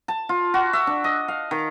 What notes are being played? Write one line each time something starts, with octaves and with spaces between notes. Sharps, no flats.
A5
F4
F#4
E5
D4
D#5
F5
D#3